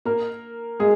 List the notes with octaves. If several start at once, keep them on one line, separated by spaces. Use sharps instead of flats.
A#3 A#4
G#3 G#4